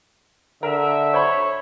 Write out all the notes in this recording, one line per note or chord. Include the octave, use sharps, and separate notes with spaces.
D3 A#4 E5
C5 C#5 B5